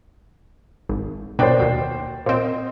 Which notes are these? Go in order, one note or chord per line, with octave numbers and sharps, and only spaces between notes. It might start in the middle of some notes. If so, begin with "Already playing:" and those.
G#1
B2 D4 D#4 C5 D5 G5
D#2 B2
A#2 C4 C5 D#5